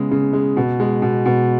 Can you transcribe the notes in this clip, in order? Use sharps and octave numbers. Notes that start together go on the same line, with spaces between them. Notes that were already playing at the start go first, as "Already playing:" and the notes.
Already playing: C#3 G#3 B3
C#3
G#3
B2
G#3
B2
B2